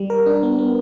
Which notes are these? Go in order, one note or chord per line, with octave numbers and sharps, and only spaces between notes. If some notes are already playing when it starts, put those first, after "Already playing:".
Already playing: G3
A#4
D4
B3
B3